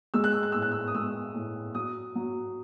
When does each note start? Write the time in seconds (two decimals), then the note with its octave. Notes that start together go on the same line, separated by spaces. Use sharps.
0.14 G#3 E6
0.24 F#6
0.33 E6
0.43 F#6
0.52 A2 E6
0.62 F#6
0.72 E6
0.87 D#6
0.94 G#3 E6
1.34 A2
1.75 F#3 D#6
2.15 F#3